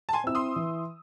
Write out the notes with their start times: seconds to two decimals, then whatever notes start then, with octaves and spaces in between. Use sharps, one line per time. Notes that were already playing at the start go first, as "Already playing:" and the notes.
0.09 A5
0.13 G#5 C6
0.24 C4 E4 E6
0.35 C6 D#6
0.56 E3